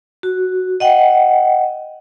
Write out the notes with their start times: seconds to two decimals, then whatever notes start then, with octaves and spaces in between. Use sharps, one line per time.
0.23 F#4
0.80 D#5 F#5 G5